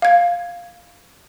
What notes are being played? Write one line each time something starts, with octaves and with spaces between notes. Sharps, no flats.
F5 G#6